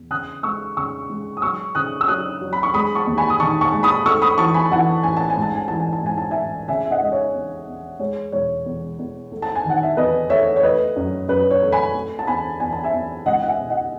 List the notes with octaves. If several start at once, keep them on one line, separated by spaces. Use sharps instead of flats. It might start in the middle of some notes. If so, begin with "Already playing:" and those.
Already playing: E2
C#3 D#6 F#6
G#3 C#6 E6
C#3 C#6 E6
G#3
D#6
F#3 C#6 E6
C#3 D#6 F#6
E6
F#3 D#6 F#6
F#3
B5
C#6
G#3 B5 D#6
A5 C#6
D#2
G#5 B5
D#6
D#3 A5 C#6
A5 C#6
G#3
B5 D#6
A3 C#6 E6
B5 D#6
E3 A5 C#6
G#5 B5
E3 F#5 A5
A1 G#5
A5
G#5
G#2
A5
G#5
E3 A5
G#5
A5
G#2 G#5
A5
A1 E5 G#5
C#3 E5 G#5
E5
D#5 F#5
G#3 D#5
C#5 E5
E2
E2
G#3 C#5
E1 C#5
E2
E2
A3
A5
G#5
D#3 F#5
E5
E2 B4 D#5
A3 C#5 E5
C#5
A3 B4 D#5
F#2
F#2 B4
C#5
A3
G#5 B5
A3
A5
E2 G#5 B5
E2 G#5
A5
E5 G#5
E2
C#2 D#5 F#5
F#5
E5 G#5
B2
D#5 F#5